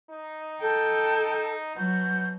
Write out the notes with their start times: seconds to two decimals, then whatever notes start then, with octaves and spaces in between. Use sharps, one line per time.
0.10 D#4
0.61 A4 G5
1.76 B2 F#3 G6